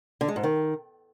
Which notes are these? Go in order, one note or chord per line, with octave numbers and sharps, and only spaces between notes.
D3
G#3
G#2
D#3